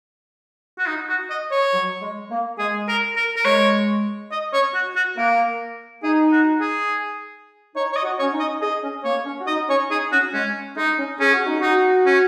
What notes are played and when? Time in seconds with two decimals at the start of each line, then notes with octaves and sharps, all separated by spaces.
0.78 F#4
0.87 D#4
1.09 F#4
1.30 D#5
1.51 C#5
1.73 F#3
2.02 G#3
2.31 A#3
2.59 G#3 G#4
2.88 A#4
3.16 A#4
3.36 A#4
3.45 G#3 C#5
4.31 D#5
4.53 C#5
4.74 F#4
4.96 F#4
5.17 A#3 A#4
6.03 D#4 G#4
6.32 F#4
6.61 G#4
7.76 D#4 C#5
7.93 C#5
7.96 D#5
8.04 F#4
8.19 C#4 C#5
8.33 D#4
8.40 D#5
8.61 G#4 D#5
8.83 C#4
9.04 A#3 C#5
9.26 C#4
9.40 F#4
9.47 D#4 D#5
9.69 C#4 C#5
9.90 D#4 G#4
10.12 C#4 F#4
10.33 G#3 C#4
10.77 G#3 D#4
10.99 C#4
11.20 C#4 G#4
11.33 F#4
11.47 D#4
11.60 D#4 F#4
12.06 C#4